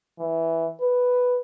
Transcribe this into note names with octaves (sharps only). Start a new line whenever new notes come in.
E3
B4